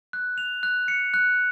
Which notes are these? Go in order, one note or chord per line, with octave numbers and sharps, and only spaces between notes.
F#6
F7
F#6
C#7
F#6